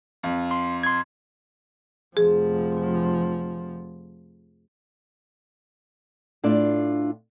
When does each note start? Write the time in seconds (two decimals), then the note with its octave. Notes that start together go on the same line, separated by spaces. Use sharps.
0.23 F2
0.51 C6
0.83 C6 G#6
2.17 F1 F3 G#4
6.44 A2 D4 F4